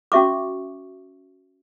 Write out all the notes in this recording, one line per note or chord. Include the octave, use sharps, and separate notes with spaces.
C#4 F#4 E5 C#6 D6